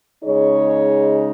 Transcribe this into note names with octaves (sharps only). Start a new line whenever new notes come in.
C#3 G#3 D#4 G#4 C#5